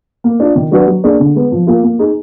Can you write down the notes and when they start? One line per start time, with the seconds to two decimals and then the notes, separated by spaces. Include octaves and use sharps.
0.24 A#3
0.40 D4 F4
0.56 D#3
0.71 F#3 D4 F#4 B4
0.87 F#3
1.03 A#3 D4 G#4
1.20 D3
1.35 G#3 B3
1.52 F3
1.67 A#3 F4 A#4
1.83 A#3
1.99 D#4 G#4